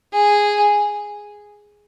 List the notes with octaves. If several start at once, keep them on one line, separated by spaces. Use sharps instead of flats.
G#4